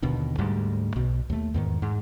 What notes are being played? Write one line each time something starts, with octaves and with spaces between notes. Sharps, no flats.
D#2 B2 D3 D#3
D2 G#2 G3
B1 B2
D#2 A3
E2 G#2 D#3
G#2